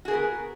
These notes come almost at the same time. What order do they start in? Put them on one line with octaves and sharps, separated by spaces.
F#4 G#4 A#4 B3